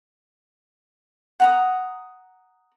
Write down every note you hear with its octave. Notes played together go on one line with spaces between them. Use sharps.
F#5 A#5 D#6